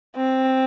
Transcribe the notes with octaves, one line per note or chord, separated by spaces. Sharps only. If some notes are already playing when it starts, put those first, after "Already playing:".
C4